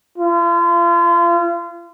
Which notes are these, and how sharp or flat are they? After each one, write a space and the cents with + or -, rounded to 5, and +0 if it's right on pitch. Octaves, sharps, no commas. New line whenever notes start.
F4 -35